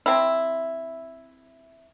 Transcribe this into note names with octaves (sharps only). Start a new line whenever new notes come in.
C4 E4